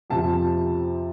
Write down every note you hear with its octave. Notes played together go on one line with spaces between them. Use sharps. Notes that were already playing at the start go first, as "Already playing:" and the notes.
F2 C3 F3 A5